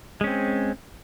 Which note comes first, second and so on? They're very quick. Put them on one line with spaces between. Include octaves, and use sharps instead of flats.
G#3 C#4 C4